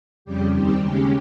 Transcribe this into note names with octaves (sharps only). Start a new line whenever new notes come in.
F2 C#3 G3 G4
D#2 D#3 G3 C4 G4
D#2 C#3 G#3 C#4 G4